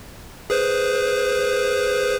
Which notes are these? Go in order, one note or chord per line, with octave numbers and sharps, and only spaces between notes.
G#4 B4 C5